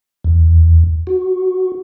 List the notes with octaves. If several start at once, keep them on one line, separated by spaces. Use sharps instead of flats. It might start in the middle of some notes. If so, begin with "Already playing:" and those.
E2
F#4